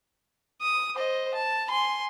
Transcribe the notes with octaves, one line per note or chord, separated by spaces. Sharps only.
D#6
C5 D#5
A5
G#5 C6